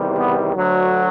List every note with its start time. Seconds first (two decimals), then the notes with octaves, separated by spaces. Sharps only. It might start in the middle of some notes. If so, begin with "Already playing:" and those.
Already playing: E2 C3 D#3 G3
0.16 B3
0.56 D2 D3 F#3